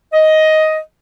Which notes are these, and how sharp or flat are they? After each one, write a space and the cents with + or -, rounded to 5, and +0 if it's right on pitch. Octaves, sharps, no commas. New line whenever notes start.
D#5 +10